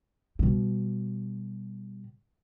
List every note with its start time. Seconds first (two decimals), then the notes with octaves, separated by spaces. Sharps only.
0.39 B2 G3